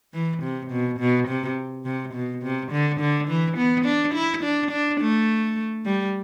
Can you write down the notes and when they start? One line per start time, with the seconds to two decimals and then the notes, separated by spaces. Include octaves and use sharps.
0.14 E3
0.43 C3
0.71 B2
0.99 B2
1.28 C3
1.85 C3
2.14 B2
2.43 C3
2.72 D3
3.00 D3
3.28 E3
3.57 B3
3.85 D4
4.14 E4
4.43 D4
4.71 D4
5.01 A3
5.85 G3